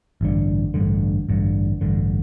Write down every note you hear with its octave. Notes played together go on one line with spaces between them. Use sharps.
A1 G2 D3
A1 G2 D3
A1 G2 D3
A1 G2 D3